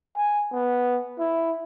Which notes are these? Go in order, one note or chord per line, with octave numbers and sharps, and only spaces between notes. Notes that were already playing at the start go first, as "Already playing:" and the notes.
G#5
B3
E4